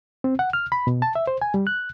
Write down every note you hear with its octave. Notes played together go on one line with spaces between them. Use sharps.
C4
F#5
F6
B5
B2
A5
E5
C5
G#5
G3
F#6